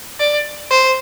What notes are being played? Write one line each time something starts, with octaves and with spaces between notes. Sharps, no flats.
D5
C5